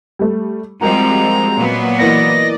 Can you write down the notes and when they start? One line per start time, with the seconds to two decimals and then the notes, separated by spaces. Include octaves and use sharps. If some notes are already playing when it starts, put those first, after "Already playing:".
0.19 G3 A3
0.81 F3 G3 G#3 C4 F#4 A#4 D#5 A#5
1.58 A#2 F#3 B3
1.99 E3 A#3 D5 D#5 A#6 C#7